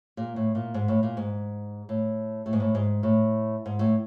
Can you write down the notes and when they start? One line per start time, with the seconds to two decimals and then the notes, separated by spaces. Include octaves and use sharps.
0.17 A#2
0.36 A2
0.55 A#2
0.74 G#2
0.88 A2
1.03 A#2
1.17 G#2
1.89 A2
2.46 A2
2.53 G#2
2.60 A2
2.75 G#2
3.03 A2
3.66 G#2
3.79 A2